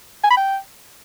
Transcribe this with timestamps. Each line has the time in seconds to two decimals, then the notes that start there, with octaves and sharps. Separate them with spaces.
0.24 G#5
0.30 B5
0.37 G5